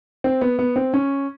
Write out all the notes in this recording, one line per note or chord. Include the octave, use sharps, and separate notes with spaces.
C4
B3
B3
C4
C#4